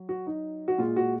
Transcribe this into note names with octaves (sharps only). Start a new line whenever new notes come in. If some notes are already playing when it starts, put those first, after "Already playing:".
Already playing: F#3
F#4
D#4
F#4
A#2 G#3 F4
F#4